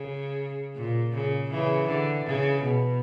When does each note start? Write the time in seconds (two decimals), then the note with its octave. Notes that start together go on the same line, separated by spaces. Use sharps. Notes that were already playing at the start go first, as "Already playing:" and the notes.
Already playing: C#3
0.76 A#2
1.13 C#3
1.50 C#3 E3
1.88 D3
2.25 C#3
2.63 B2